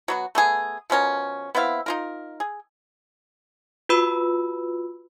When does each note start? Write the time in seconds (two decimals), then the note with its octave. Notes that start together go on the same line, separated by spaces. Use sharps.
0.08 F#3 B3 F#4
0.35 A3 B3 G#4
0.90 B2 F3 C#4 A#4
1.55 B3 C4 E4 F5
1.86 D#4 F4 A#4
2.40 G#4
3.89 F4 F#4 B4 B5 E6